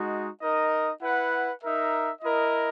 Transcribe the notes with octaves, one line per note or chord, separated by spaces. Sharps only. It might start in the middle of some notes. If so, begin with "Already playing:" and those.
Already playing: G#3 D#4 F#4
D#4 A#4 D#5
E4 B4 F#5
D#4 A#4 E5
E4 A#4 D#5